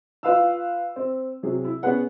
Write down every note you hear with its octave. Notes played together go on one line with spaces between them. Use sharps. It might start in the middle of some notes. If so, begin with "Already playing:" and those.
F4 B4 F5 E6
C4
C3 F#3 G#4
E4
B3 C#4 G#4 B4 F#5